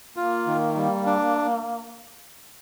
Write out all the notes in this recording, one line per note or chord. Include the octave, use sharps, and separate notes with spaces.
A#3 F4
D#3
G3
D4